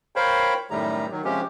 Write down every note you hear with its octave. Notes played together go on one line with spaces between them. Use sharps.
A#4 C5 C#5 F5 G5 B5
F#2 A2 D#3 G3 A3 A#5
D#3 F#3
C3 F3 G#3 C#4 G4